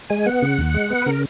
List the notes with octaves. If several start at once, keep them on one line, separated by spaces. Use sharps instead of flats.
G#3 G#5
B3 F#5
C#3
D#2
G#3
B3
B4
C#3 A#4